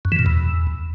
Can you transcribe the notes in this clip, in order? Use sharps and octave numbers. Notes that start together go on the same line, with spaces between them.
F#2
E3
A#2
E2